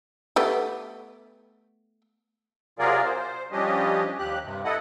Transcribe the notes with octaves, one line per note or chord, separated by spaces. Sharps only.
A3 B3 G4
C3 F#3 F4 G#4 A#4 D5
C5
F3 G3 C#4 D4 G4 D#5
D#2 G4 F#6
G2 C3
E4 A4 D#5 F#5